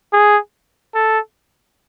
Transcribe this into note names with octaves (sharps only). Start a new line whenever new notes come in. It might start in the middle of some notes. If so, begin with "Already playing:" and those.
G#4
A4